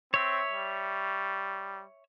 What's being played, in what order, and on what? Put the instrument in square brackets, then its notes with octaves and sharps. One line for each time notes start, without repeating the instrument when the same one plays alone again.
[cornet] C4 [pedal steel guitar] C#5 E5
[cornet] G3